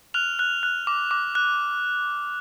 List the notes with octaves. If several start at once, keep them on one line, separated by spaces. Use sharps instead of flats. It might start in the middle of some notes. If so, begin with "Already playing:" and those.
F6 F#6 F7
F#6
F#6
D6
D6
F#6